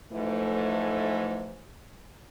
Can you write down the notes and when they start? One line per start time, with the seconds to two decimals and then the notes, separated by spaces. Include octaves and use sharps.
0.12 G#2 E3 F3 A3